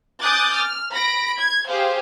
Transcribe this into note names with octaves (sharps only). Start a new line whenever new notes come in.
G#5 D6 D#6 F#6 G6 A6
F6
B5 A#6 D7
G#6
G4 G#4 C5 F5